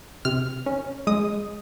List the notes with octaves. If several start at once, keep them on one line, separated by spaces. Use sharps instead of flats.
C3 F6
C#4
G#3 D#6